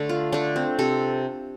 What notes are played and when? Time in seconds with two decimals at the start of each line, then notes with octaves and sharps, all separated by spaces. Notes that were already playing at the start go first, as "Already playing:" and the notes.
Already playing: D3 A3 D4
0.09 F4
0.32 D3 A3 D4
0.56 C4
0.79 C3 A4